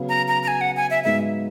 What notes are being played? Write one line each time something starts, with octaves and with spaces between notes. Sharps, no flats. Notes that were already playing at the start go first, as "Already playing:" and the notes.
Already playing: C#3 F#3 B3
A#5
A#5
A#5
G#5
F#5
G#5
E5
G#2 F#3 B3 D#4 G#4 E5